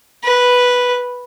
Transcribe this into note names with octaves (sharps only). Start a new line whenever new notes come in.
B4